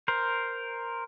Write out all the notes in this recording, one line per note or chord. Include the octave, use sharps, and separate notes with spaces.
A#4 C5